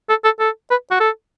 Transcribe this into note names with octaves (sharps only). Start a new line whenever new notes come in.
A4
A4
A4
B4
F#4
A4